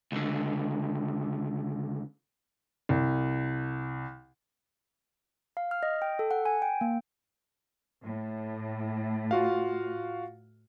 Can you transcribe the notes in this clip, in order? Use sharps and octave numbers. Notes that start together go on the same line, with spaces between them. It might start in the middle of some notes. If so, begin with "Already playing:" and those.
C#2 D3
C2
F5
F6
D#5
G5
A4
F#5
G#5
G5
A#3
A2
F4 F#4 F5